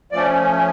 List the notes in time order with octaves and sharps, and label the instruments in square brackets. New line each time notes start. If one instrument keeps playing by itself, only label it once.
[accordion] F3 A3 C#4 D5